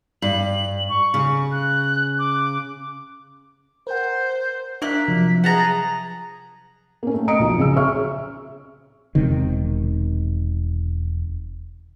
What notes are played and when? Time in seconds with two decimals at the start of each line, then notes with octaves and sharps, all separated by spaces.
0.22 G2 F#7
0.89 C#6
1.14 C#3
1.52 F#6
2.19 D6
3.87 A#4 C5 F#5
4.82 A#3 D4 E5 F#6
5.08 C3 F3 F#3
5.44 G#4 F#5 A5 A#5
7.03 A#3 C#4
7.14 A3
7.28 D#5 A#5 D#6 C#7 D7
7.39 B1 F3
7.58 C#3 C#4 G#4 E6
7.76 G#4 C#5 E5 C#6 E6 F6
9.15 E1 C3 D#3